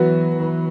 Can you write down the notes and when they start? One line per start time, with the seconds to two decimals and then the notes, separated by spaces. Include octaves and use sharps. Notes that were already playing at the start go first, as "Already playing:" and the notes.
Already playing: E3 F#3 B3 F#4 B4
0.37 E3